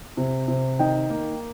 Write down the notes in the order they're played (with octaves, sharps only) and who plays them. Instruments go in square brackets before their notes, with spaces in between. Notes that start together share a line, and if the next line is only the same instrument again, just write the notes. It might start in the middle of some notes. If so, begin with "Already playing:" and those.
[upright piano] C3
C3
D#3 D#5 G5
A#3